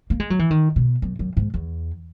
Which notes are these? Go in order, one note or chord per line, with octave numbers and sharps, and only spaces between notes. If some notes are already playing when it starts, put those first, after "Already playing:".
A#3
G#3
F#3
E3
D#3
B2
F#2
F#2
G#2
E2